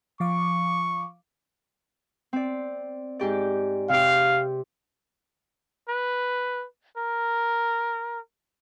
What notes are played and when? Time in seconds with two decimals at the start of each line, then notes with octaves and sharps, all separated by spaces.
0.20 F3 F5 C#6 D6
2.33 C4 D5
3.20 G#2 G4 D5
3.89 C3 G4 F5
5.89 B4
6.98 A#4